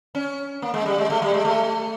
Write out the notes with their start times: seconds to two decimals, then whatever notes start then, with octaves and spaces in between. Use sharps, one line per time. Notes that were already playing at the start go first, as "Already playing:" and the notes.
0.15 C#4
0.62 A#3
0.74 G#3
0.86 G3
0.98 G#3
1.10 A3
1.22 G3
1.34 G#3
1.45 A3